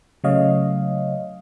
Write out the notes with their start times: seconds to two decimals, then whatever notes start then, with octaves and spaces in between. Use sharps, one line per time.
0.24 C#3 F#3 A3 C#5 D#5 F5